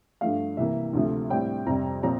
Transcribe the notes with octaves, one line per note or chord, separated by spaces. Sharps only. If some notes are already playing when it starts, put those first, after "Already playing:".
G2 F3 A3 F5
C2 C3 E3 A#3 E5
D2 C3 F3 A3
A2 G3 C4 G5
F2 C3 G3 A#5
A#2 F3 C4 A#5